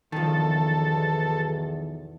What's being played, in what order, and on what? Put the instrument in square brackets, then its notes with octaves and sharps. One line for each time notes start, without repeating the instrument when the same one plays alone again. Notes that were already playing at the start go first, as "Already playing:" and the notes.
[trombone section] B1 E2 [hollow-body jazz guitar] D#3 F3 [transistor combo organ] A4